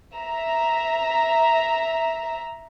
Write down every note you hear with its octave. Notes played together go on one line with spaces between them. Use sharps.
E5 A#5